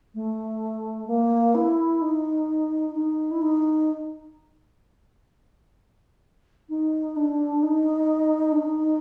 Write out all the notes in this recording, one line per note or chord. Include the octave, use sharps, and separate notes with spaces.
A3
A#3
E4
D#4
D#4
E4
D#4
D#4
D4
D#4
D4
D#4